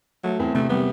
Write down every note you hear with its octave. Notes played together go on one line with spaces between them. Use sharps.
F#3 A3
E2 C4
C3 A3
G3 B3